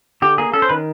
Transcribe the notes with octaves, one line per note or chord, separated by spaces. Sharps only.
D3 G4
A#3 G#4
C#4 A4
C5
D#3 B4